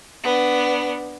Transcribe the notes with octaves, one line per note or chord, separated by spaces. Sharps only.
B3 D4